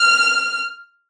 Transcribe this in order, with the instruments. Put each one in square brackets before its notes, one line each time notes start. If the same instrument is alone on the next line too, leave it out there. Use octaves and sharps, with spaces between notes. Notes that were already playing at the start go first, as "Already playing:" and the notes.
Already playing: [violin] F6